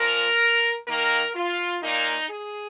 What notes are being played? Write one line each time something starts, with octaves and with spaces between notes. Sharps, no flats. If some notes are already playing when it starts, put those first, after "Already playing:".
Already playing: A#2 F3 A#4
D#3 A#3 A#4
F4
A#2 A#3 D#4
G#4